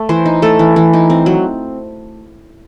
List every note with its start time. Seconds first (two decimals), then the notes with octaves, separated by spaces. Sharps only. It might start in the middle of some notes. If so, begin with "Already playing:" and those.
Already playing: A3
0.09 E3 C5
0.26 D#4
0.42 A3 A4
0.59 E3
0.76 E3
0.94 D#4
1.10 C4
1.26 F#3